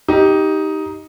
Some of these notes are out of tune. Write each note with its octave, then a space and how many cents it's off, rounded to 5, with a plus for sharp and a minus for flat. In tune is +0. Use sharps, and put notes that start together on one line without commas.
D#4 +10 G4 -5